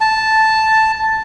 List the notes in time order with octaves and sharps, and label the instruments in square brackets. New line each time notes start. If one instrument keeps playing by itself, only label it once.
[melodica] A5